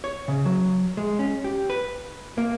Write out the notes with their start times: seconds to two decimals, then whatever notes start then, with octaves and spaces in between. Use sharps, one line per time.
0.04 C#5
0.28 C#3
0.45 F#3
0.97 G#3
1.19 C#4
1.44 G4
1.70 B4
2.38 A#3